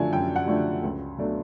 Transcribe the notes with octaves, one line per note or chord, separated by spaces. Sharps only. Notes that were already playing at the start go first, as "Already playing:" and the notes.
Already playing: F#2 D3 F3 A3 D4 G#5
F#2 G5
F#5
D3 F3 A3 D4
C#2
B2 F#3 A3 D4